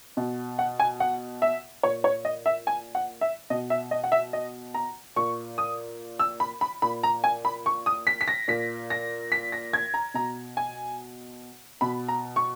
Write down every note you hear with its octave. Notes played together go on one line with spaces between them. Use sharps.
B2
F#5
G#5
F#5
E5
A#2 C#5
C#5
D#5
E5
G#5
F#5
E5
B2 D#5
E5
D#5
F#5
E5
D#5
A#5
A#2 C#6
D#6
E6
B5
B5
A#2 B5
A#5
G#5
B5
C#6
D#6
B6
B6
A#6
A#2 B6
A#6
B6
A#6
G#6
A#5
B2 A#5
G#5
B2 B5
A#5
C#6